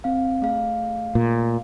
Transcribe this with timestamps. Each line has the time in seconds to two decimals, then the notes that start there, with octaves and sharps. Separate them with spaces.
0.04 C4 F5
0.42 A3 G#4 F5
1.15 A#2